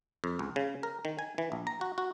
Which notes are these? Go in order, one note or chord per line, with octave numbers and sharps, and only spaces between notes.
F2
C#2
C#3
A#4
D#3
G#5
E3
A#1
A#5
F#4
F#4